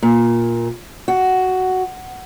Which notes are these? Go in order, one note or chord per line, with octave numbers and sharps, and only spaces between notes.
A#2
F#4